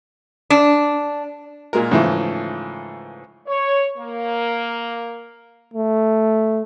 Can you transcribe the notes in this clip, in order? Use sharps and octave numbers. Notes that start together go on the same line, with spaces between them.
D4
A#2 G#3 A#4
G#2 C#3 E3 F3 A3
C#5
A#3
A3